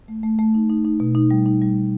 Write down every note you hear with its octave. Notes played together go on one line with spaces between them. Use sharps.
A3
A3
A3
D#4
D#4
D#4
B2
D#4
G3
D#4
G3